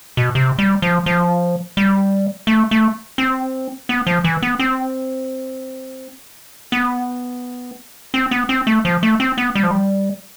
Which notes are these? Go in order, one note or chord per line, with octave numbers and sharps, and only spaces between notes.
B2
C3
G3
F3
F3
G3
A3
A3
C4
B3
F3
E3
B3
C4
B3
C4
B3
C4
A3
F3
A3
C4
B3
G3
F3
G3